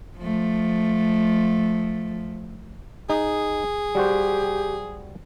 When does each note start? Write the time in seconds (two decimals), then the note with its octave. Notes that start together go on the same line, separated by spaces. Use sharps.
0.18 F3 A3
3.10 D#4 G#4
3.95 G3 F#4 G4 C5